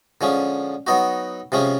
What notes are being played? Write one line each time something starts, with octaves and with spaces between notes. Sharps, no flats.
D3 F3 G#3 C#4
F#3 B3 D#4 F#4
C3 F3 G#3 C#4